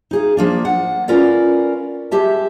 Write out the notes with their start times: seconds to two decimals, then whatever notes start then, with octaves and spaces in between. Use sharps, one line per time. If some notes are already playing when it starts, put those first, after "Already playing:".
0.11 D#4 G#4 F5
0.37 F3 A#3 D4
0.65 F#5
1.08 C#4 F4 A#4 B4 D5 F5
2.11 G#3 G4 E5 A5